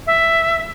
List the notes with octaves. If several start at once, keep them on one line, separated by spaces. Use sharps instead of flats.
E5